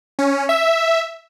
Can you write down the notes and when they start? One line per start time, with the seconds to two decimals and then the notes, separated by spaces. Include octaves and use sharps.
0.19 C#4
0.49 E5